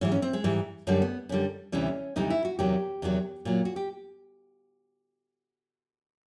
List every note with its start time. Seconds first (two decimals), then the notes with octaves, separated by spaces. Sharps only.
0.01 G#2 E3 G3 C#4
0.12 C#4
0.22 C4
0.33 G#3
0.44 G#2 E3 G3
0.87 F#2 D3 G3 A3
1.02 B3
1.29 F#2 D3 G3
1.72 D2 C3 E3 G3 C#4
2.16 D2 C3 E3 G3 D#4
2.30 E4
2.45 F#4
2.59 E2 C3 D#3 F#3 G4
3.02 E2 C3 D#3 F#3
3.45 A#2 F#3
3.65 F#4
3.76 G4